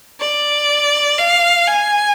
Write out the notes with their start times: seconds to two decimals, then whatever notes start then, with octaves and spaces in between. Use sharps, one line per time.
0.20 D5
1.19 F5
1.68 G#5